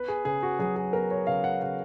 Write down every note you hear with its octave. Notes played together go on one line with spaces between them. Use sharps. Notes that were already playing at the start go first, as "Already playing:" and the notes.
Already playing: B3 B4
G#4
C#3 G#4
F#4
F#3 G#4
G#4
B3 A#4
C#5
C#3 F5
F#5
C#3 F#5